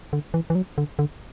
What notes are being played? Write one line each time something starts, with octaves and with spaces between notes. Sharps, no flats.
D3
E3
E3
F#3
D3
D3